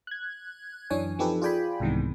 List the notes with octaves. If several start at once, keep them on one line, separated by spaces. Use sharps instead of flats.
F#6 G#6
F#2 E3 D4 C#5 G#5
F3 C4 D#4 G4 A4 B4
F4 G#4 D5 G5 G#5 B5
C2 G#2 C3 D#3 E3 B3